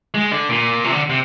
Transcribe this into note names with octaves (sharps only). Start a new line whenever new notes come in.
G#3
D3
A#2
C3
D3
C3